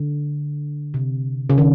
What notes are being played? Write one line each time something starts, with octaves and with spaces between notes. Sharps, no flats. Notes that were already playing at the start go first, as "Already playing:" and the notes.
Already playing: D3
C3
C#3
D#3